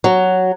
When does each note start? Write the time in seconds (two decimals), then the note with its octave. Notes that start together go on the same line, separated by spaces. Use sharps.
0.04 F#3